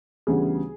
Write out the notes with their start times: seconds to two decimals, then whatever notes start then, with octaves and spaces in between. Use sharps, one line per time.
0.27 D2 C#3 E3 G3 B3 G#4